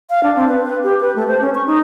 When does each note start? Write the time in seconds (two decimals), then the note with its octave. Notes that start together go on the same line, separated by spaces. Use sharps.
0.10 F5
0.23 D4
0.36 C4
0.48 B4
0.66 B4
0.83 G4
1.00 B4
1.16 A3
1.28 C5
1.41 C#4
1.55 C#6
1.66 D#4